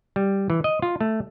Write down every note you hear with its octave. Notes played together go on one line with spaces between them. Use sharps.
G3
E3
D#5
F4
A3